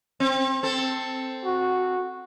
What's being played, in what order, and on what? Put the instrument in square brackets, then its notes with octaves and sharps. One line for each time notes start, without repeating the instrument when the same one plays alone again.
[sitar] C4
C4 A4
[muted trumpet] F#4